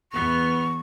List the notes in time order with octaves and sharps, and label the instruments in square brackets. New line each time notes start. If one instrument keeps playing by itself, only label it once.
[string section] E2 B3 F6 [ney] C#6